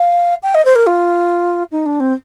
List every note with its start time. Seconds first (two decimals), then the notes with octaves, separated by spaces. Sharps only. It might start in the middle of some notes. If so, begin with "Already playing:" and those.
Already playing: F5
0.43 G5
0.55 D#5
0.65 C5
0.76 A#4
0.87 F4
1.72 D#4
1.86 D4
2.00 C4